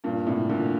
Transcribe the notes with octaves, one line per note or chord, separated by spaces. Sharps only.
G2 A#2
A2 C3
A#2 D3